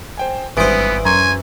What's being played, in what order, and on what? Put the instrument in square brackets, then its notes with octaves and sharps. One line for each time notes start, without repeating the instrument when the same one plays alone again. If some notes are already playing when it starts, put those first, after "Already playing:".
[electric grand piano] C5 G5 G#5
[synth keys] G#1 D#6 D7 [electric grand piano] G2 [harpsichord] E3 C5 [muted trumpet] B3
[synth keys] F#2 [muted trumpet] G#5 [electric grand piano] A#5 C6 C#6